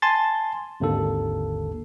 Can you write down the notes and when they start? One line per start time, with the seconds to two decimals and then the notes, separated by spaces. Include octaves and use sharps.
0.02 G#5 A5 C6 A6
0.80 G#1 D#2 D3 A#3 A4